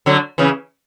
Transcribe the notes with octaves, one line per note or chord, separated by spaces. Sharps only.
D3 F#3
C#3 E3